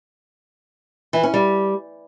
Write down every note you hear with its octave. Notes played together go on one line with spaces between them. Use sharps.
E3
C#4
G3